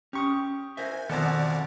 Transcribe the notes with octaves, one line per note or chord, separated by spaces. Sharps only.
C#4 G4 C#6 D#6
A#4 C5 E5 G#5
F2 B2 D#3 A4 C5 D5 F#5 G#5